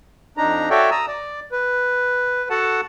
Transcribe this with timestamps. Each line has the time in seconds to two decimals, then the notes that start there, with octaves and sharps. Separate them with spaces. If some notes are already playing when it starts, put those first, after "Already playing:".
0.37 F2 D4 D#4 A#5
0.70 F#4 A4 C#5 D5 E5 G5
0.91 A#5 D#6 E6
1.08 D5
1.52 B4
2.50 F#4 A4 F#5 A5